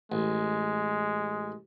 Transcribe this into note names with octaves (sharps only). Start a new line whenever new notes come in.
A1 G#3